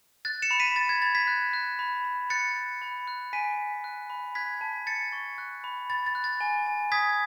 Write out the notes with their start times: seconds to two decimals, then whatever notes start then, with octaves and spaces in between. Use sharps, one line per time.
0.25 F#6 A6
0.42 C#7 E7
0.51 B5
0.60 B6 D#7
0.76 B5 A6
0.89 G#6
1.02 B5 A6
1.15 G#6 B6
1.27 F#6
1.53 F#6
1.79 B5
2.05 B5
2.30 F#6 A6 C#7
2.56 F#6
2.82 B5
3.08 F#6
3.33 G#5 B6 D#7
3.58 G#5
3.84 F#6
4.10 B5
4.35 F#6 G#6 B6
4.61 A5
4.87 A5 A6 C#7
5.13 C#6
5.38 F#6
5.64 B5
5.90 B5 A6
6.06 A6
6.15 F#6
6.24 A6
6.40 G#5
6.67 G#5
6.92 D#6 G#6 B6